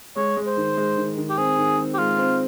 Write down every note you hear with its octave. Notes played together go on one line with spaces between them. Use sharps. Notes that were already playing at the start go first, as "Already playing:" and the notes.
G#3 C#5
G#3
C5
D#3
G#3
D#3
D#3
G4
C4 G#4
D#3
C4
G4
G#3 F4
C4